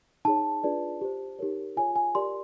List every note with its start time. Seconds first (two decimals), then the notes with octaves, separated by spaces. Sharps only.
0.25 D#4 G#4 C#5 A5
0.63 D4 F4 G#4 B4 D5
1.01 G4 C5
1.39 D#4 G4 A#4 C#5
1.77 F4 G#4 C#5 G#5
1.96 G#5
2.15 G4 A#4 D5 C6